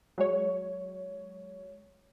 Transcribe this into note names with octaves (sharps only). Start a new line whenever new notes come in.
F#3 G#3 C#5